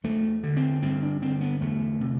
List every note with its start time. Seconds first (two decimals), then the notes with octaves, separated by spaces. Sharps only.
0.04 E2 A3
0.43 D3
0.57 C4
0.82 G2 C4
1.03 D4
1.22 D3 C4
1.41 B3
1.61 E2 A3
2.01 C3